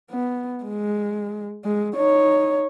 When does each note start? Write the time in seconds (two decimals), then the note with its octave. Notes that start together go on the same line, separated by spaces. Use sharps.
0.10 B3
0.64 G#3
1.64 G#3
1.96 D#4 C#5